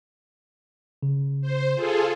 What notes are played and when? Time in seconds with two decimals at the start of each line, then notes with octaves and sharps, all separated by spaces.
1.03 C#3
1.42 C5
1.75 F4 G#4 A4